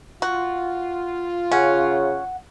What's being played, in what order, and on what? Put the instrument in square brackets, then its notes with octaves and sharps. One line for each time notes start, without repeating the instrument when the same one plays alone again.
[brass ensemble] F4 [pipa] F#4
[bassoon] C#3 [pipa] C#4 [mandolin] F#5